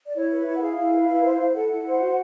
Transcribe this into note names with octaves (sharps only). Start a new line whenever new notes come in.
D5
E4 C#5
B4
E4
F#5
G#4 F5
E4
B4
E4
C5
E4
A4 F#5
E4
C5
F#4